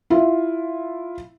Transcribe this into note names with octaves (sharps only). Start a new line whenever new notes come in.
E4 F4